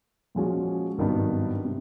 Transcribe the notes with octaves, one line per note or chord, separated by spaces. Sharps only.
A#2 F3 G#3 C#4 F#4
G#1 G2 D#3 F#3 B3
C3